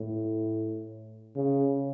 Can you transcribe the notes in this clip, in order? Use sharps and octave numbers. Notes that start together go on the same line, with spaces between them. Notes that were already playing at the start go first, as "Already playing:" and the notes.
Already playing: A2
C#3